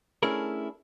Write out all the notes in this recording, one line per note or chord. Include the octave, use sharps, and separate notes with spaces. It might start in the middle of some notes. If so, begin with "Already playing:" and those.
A3 C#4 D4 E4 G#4 A#4